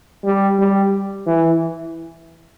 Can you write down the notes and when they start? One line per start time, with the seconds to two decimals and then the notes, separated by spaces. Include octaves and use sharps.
0.24 G3
0.59 G3
1.27 E3